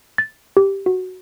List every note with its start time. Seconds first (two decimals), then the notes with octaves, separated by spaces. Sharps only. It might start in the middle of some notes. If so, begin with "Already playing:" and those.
0.18 A6
0.57 G4
0.86 F#4